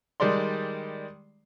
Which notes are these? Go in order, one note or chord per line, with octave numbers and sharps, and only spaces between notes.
D#3 G3 G#3 D5 C6